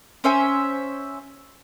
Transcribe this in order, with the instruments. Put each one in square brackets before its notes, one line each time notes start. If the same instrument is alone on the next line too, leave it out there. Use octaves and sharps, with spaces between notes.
[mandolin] C#4 C5 E5 G#5